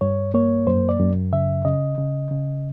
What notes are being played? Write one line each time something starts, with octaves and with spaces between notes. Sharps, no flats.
G2 C#5
A#3 C#5
F#2 C5
D5
F#2
C#3 E5
C#3 D#5
C#3
C#3